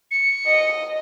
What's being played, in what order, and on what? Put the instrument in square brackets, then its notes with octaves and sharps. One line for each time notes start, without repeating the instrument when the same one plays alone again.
[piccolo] C#7
[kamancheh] D#5